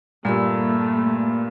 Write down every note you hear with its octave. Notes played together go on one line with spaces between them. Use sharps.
G2 A#2 A3 A#3 B5 E6